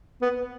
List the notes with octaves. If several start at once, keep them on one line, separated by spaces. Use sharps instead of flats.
B3